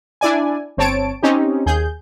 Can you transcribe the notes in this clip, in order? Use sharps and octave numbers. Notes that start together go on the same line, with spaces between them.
D4 E4 D5 G#5
G1 C4 C#5 A5 D7
C4 C#4 D#4 G4
D#2 G#4 G6